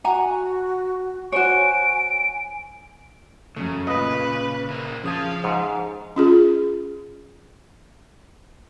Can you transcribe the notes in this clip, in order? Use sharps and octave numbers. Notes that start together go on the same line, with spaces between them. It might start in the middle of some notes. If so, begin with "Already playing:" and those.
F#4 F#5 G#5 A#5
F#4 C5 C#5 G#5 D7
F#2 C#3 A3
A#2 F4 B4 D#5
A#4 C5 E5
C#3 F3 F5 A5 D#6 G#6
G#2 C#7
C#4 F4 G#4